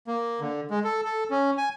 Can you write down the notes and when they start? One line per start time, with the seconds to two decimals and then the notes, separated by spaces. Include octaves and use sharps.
0.07 A#3
0.40 D3
0.71 G#3
0.84 A4
1.05 A4
1.31 C#4
1.58 G#5